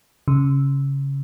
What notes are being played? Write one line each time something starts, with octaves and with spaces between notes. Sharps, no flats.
C#3